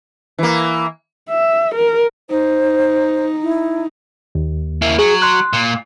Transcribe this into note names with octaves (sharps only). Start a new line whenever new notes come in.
E3 A#3
E5
A#4
D#4 C5
E4
D#2
A#3 E4
F#3 G#4
C6 F#6
A#2